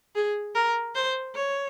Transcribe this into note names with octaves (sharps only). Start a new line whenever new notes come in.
G#4
A#4
C5
C#5